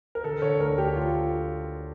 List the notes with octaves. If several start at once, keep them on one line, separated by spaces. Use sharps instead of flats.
A#4
D3 A4
D3 C#5
D2 A#4
D2 G4
D2 F4